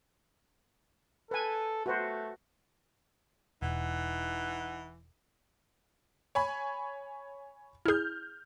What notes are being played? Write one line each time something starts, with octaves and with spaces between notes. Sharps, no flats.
A4 B4 G#5
A3 F#4 B4 C5
E1 E3 D#4 F#5
C#5 G#5 B5
E4 G#4 F6 G6